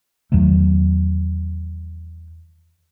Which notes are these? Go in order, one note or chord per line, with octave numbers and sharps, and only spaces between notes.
E2 D#3 F#3 A3